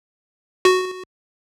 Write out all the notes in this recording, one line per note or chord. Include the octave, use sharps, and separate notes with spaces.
F#4